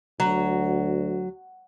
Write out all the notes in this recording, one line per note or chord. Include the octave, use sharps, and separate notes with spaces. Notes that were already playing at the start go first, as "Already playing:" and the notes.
D2 F#3